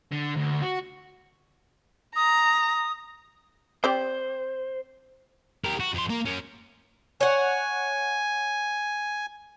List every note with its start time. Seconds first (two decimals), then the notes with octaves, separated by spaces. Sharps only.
0.11 D3
0.36 D2
0.62 F#4
2.16 A#5 D#6
3.84 C4 G4 C5 D5
5.65 G4 A#4
5.80 F#4
5.94 F2 C6
6.10 A#3
6.25 F#2 C#4
7.21 C#5 F#5 G#5